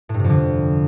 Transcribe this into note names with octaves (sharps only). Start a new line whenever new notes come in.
A2
G2
C3
F2
D3